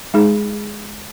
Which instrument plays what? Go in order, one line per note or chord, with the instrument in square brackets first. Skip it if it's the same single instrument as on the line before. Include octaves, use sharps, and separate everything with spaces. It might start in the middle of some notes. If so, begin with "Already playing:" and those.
[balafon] G#3 D#4 G#4